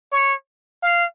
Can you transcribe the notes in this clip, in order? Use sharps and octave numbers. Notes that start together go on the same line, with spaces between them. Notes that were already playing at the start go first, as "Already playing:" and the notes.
C#5
F5